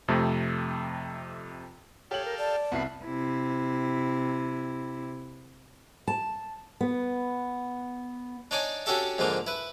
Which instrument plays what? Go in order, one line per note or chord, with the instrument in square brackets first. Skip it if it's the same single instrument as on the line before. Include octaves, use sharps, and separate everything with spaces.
[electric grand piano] F2 C3 A3
[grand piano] G4 F#7 [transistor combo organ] A4 F5 G5 [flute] C#5
[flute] A#4
[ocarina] D5 [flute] A5
[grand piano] C2 E4 C7 [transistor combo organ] B3 F#4
[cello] C3 E4
[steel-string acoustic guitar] A5
B3
[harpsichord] D4 D#4 C#5 D5 G#5
C#4 D4 F#4 G4 A4 E5
G#2 D3 F3 A#3 D4
E4 B4